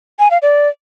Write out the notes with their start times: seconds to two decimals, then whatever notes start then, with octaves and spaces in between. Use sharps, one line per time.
0.19 G#5
0.31 F5
0.42 D5